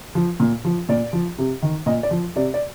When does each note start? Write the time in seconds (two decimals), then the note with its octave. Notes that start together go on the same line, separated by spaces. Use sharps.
0.15 F3
0.40 A#2
0.65 F3
0.89 A#2 D5
1.13 F3
1.38 C3
1.62 D#3
1.86 A#2 D#5
2.03 D5
2.11 F3
2.36 C3 D5
2.54 D5